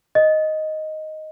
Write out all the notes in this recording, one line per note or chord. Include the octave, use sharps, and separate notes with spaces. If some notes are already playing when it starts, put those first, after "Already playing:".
D#5